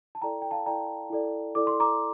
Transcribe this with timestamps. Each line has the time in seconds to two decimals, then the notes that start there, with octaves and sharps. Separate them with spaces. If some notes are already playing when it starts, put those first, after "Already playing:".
0.15 A5
0.22 E4 A4 D5 G5 A#5
0.42 G5
0.51 F5 A5
0.66 E4 A4 D5 G5 A#5
1.10 E4 A4 D5
1.55 E4 A4 D5 D6
1.67 C6
1.80 A#5 D6